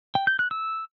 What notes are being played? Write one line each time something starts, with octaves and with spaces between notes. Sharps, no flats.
G5
G6
F#6
E6